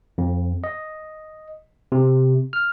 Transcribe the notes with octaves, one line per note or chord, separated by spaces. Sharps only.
F2
D#5
C3
F6